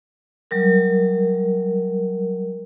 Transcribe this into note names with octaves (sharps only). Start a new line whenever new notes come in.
F#3 G3 A#4